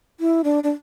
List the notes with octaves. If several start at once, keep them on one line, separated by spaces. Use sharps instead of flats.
E4
D4
D4